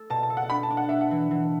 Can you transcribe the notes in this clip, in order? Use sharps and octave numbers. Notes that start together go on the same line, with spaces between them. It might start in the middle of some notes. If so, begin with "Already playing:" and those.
Already playing: A3 A4
B2 A5
A5
A4
F#5
D4 B5
A5
D4
F#5
D4 E5
F#5
E3
E3